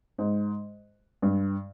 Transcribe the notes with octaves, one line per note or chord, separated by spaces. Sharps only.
G#2
G2